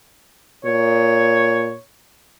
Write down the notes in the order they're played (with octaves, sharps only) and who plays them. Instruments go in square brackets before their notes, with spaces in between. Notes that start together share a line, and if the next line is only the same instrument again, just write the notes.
[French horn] A#2 [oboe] C#5